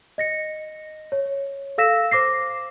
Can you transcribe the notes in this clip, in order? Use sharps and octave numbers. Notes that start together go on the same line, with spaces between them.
D#5 A#6 C#7
C#5
A4 F5 E6 A#6 B6 E7
C5 D6 A#6 C7